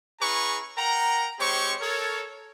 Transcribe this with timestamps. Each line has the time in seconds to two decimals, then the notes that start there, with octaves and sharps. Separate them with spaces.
0.21 C#4 E4 G#4 B4 A#5 C#6
0.77 A#4 F#5 G5 A#5
1.40 G#3 C4 G4 C5 C#5 C#6
1.80 A4 A#4 C#5